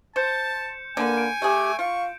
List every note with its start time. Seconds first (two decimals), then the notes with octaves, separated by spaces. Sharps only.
0.16 C5 A5 G6 C#7 E7
0.97 D3 A#3 B4 G#5
1.17 D7
1.42 A3 G4 G#4
1.79 F4 F5 C#6